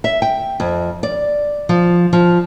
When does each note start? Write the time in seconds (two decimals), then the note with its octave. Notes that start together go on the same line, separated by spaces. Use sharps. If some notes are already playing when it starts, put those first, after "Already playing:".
0.04 E5
0.22 G5
0.60 F2
1.03 D5
1.69 F3
2.13 F3